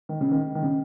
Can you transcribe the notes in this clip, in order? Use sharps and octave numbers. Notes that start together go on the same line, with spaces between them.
D#3
C#3
D#3
D#3
C#3